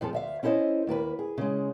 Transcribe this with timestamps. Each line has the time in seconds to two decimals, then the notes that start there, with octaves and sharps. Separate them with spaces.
0.01 F2 F3 G#4 A4
0.13 D2 E5 F5
0.43 C#4 E4 A4 C5 D#5
0.87 D#2 A#3 G#4 B4
1.19 G#4
1.38 C#3 G#3